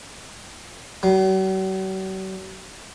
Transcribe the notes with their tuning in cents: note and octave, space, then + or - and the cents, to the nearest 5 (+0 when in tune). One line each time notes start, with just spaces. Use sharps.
F#3 +45